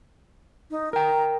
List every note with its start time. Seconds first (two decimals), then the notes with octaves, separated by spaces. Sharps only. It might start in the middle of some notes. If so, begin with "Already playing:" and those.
0.71 D#4
0.93 A#4 G5 A#5